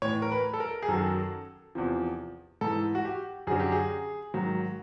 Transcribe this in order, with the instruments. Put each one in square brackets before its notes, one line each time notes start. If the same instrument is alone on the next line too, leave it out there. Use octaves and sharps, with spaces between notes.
[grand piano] A2 E3 C#5
A#4
B4
A4
A#4
G#4
F#2 D#3 F#3 A4
E2 C3 F3
G#2 E3 A4
F#4
G4
F#2 D3 F#3 G#4
G4
G#4
G#2 D#3 F#3